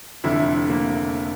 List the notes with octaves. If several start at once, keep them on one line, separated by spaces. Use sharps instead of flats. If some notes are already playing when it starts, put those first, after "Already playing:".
F1 F2 D3 E4
A#3